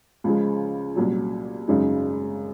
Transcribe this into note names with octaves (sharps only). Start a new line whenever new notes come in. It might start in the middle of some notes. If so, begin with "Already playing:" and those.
C#2 C#3 F3 G#3
C2 A#2 F#3 C#4
G#1 F#2 C#3 G#3 D#4